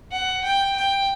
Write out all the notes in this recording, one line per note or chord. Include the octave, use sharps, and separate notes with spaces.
F#5
G5
G5